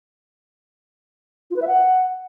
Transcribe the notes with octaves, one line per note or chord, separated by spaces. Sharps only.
F4
B4
E5
F#5